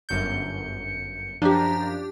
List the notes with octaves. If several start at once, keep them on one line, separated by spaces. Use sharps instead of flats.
G1 F#2 G6 C#7
F#2 F3 D4 G4 A#5